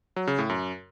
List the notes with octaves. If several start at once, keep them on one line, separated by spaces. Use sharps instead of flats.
F#3
C#3
A2
F#2